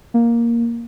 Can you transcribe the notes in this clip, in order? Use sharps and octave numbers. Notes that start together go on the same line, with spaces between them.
A#3